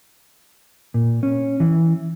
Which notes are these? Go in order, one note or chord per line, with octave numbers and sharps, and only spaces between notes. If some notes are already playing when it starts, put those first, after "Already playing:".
A#2
C#4
E3